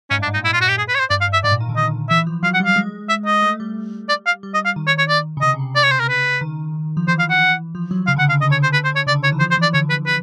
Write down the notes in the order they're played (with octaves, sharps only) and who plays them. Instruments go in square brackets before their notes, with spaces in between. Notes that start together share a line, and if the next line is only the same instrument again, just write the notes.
[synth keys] G#2 [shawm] C#4
[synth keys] G2
[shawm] D4
[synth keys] G#2
[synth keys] A#2 [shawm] D#4
[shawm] E4
F4
F#4
G4
G#4
B4
C#5
C5
[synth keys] G2 [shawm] D5
[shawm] F5
[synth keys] G2
[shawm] E5
[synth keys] G#2 [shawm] D5
[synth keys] A#2
D#3
D3
[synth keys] D#3 [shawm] D#5
[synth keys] E3 [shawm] E5
[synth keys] F3
[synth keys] F#3 [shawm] F5
[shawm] F#5
[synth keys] G3
[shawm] F5
[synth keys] G3
G#3
[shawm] E5
D#5
[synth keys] A3
G3
[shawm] D5
F5
[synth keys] G3
[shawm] D#5
F5
[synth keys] D#3
[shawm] C#5
C#5
D5
[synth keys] C#3
[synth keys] C3 [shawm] D#5
[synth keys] C#3
C3
[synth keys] C#3 [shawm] D5
[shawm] C#5
C5
A#4
B4
[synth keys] D#3
F3
[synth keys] E3 [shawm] C5
[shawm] F5
F#5
[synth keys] F3
F#3
[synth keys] C#3 [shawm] F5
[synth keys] D3 [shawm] F#5
[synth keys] C#3
[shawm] F5
[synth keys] D3
[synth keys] C#3 [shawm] D#5
[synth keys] D3 [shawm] C#5
[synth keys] C#3 [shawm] C5
[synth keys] D3 [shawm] B4
[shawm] C5
[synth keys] D3
[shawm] C#5
[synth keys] C#3 [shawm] D5
[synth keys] D3
[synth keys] D#3 [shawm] C#5
[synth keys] E3
[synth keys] F3 [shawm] C5
[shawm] C5
[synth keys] E3 [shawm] D5
[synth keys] D3 [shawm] C#5
[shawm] B4
B4